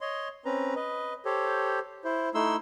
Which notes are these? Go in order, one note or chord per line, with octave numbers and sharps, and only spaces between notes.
C#5 D#5 C6
C4 C#4 B4 A#5
B4 D#5
G4 A4 C5 C#5
E4 C5
A3 D#4 E4 C6 E6